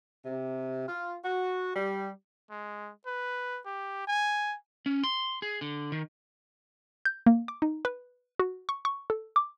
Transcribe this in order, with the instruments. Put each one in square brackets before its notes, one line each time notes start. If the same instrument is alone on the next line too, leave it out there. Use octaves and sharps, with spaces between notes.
[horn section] C3
F4
F#4
G3
[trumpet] G#3
B4
G4
G#5
[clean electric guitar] C#4
C6
G#4
D3
D#3
[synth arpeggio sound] G6
A#3
D6
D#4
B4
F#4
C#6
C#6
A4
D6